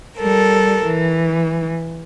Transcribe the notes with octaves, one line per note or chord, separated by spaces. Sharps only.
G3 A4 A#4
E3